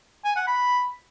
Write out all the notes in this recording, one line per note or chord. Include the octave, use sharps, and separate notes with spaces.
G#5
F#5
B5